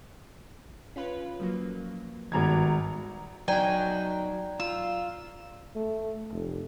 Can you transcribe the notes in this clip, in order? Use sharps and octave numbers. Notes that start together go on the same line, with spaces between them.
C#4 F4 B4
F3 F#3 A#3
G#1 D#3 G3 B3 A#5 G#6
F#3 D#4 F#4 D5 G5 G#5 A#5
F4 E6
A3
F1